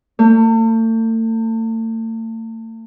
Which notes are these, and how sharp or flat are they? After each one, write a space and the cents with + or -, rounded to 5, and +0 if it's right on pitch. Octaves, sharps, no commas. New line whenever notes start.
A3 +40